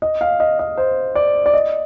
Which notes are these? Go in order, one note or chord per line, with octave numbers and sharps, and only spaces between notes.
D#5
F5
D#5
D#5
C5
D5
D5
D#5